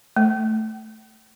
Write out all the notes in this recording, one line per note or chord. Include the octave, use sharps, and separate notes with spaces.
A3